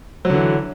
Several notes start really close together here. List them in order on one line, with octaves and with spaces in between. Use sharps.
F#3 D3 E3